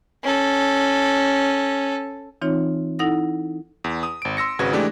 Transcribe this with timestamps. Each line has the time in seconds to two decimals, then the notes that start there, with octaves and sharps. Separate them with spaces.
0.23 C#4 A4
2.42 E3 C4 D#4 F4 C#5
2.99 D#4 E4 A4 F#5 D#6 A#6
3.84 E2
4.03 D#6
4.22 G#1 D7
4.37 C6 E6 A#6 C#7
4.59 G#1 C#3 F#4 B4 G#6
4.73 E3 G#3 A3 D4 G4 D5